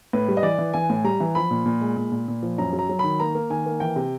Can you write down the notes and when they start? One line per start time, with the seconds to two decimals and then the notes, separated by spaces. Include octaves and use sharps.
0.13 A2 B4
0.28 G3
0.37 D#5
0.43 E3 D5
0.58 E3
0.74 E3 G#5
0.90 A2
1.04 G3 A#5
1.20 E3
1.35 F3 B5
1.51 A#2
1.66 A#2
1.81 G#3
1.97 A#2
2.12 A#2
2.28 A#2
2.43 F3
2.58 F#2 A#5
2.73 F#3
2.79 A#5
2.89 F#3
2.99 D#3 B5
3.20 A#3 A#5
3.35 A#3
3.50 D#3 G#5
3.66 A#3
3.80 E3 G5
3.96 C3